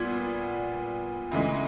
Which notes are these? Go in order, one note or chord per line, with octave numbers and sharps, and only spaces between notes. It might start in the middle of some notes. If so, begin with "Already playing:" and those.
Already playing: A#2 G3 B3 G#6
D2 C#3 E3 G#3